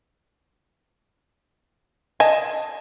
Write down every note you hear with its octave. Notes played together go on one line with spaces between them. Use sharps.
D#5 G#5 A5